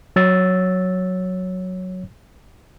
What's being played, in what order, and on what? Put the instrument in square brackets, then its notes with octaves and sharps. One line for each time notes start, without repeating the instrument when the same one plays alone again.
[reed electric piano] F#3 C#5 E6 A6